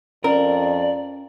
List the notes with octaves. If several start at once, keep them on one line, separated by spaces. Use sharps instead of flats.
F2 C#4 A#4 D5